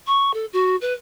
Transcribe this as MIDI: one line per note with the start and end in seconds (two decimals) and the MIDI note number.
0.06 0.33 85
0.33 0.45 69
0.53 0.76 66
0.81 0.93 71